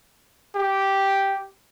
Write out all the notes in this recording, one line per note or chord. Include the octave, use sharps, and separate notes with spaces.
G4